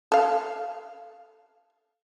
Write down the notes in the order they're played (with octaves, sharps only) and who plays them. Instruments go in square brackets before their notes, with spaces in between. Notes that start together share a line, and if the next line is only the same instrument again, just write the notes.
[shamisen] A4 F5